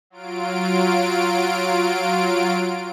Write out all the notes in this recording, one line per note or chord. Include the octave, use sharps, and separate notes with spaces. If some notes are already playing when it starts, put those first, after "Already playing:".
F#3 F4 D7